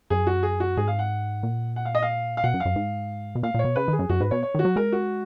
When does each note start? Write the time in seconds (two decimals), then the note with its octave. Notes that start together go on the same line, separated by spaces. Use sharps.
0.10 F#2 G#4
0.27 F#4
0.43 G#4
0.60 F#4
0.77 G#2 G#4
0.88 F5
0.99 F#5
1.43 A#2
1.76 F#5
1.85 F5
1.95 D#5
2.02 F5
2.37 F5
2.44 B2 F#5
2.54 F#2
2.60 F5
2.65 F#2
2.76 G#2
3.35 B2
3.43 A#2 F5
3.54 A#2 C#5
3.65 B2
3.76 C#3 B4
3.88 D#3 G#4
3.99 F#2
4.09 F#2 F#4
4.20 G#2 B4
4.31 B2 C#5
4.43 C#5
4.54 D#3 F#4
4.65 F#3
4.76 G#3 A#4
4.92 F#4